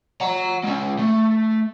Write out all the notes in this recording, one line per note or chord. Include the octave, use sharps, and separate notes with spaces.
F#5 A#5
G#3 C#4
A3